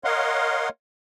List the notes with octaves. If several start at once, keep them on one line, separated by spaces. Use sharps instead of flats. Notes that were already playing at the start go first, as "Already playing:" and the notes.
A#4 C#5 D#5 F5 F#5 C6